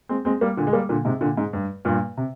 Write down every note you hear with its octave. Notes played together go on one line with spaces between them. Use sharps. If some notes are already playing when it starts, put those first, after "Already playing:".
G#3 C4
G#3 C4
G3 A#3
A#2 D3
G#3
G3 A#3
A#2 D3
G#2 C3
A#2 D3
G#2
G2
G2 A#2
C3